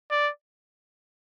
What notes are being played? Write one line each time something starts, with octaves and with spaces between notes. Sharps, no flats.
D5